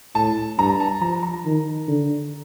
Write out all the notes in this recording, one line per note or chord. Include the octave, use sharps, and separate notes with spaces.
A2 A5
G2 A#5
A5
F3 A#5
A#5
D#3
D3